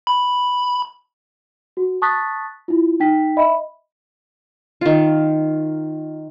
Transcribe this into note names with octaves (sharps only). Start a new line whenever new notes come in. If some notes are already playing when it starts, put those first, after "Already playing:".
B5
F#4
A5 C#6 D#6 F#6 A6 B6
E4 F4
D#4 G5 B6
D#5 E5 B5
D#3 F4